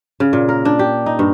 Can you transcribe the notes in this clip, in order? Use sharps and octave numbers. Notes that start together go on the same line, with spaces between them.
C#3
A#2
A#4
D4
G4
D#4
G2